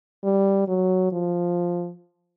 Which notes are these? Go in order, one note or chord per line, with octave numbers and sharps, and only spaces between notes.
G3
F#3
F3